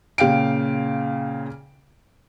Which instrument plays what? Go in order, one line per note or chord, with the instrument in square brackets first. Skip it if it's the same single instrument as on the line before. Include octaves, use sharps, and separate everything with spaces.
[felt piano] A#2 C#3 F5 G5 D7